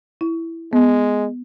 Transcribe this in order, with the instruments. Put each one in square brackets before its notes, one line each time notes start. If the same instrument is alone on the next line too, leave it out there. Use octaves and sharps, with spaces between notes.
[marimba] E4
[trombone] G#3 [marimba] B3